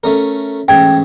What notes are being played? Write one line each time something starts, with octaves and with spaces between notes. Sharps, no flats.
A3 C#4 A#4
A1 G#2 G5 G#6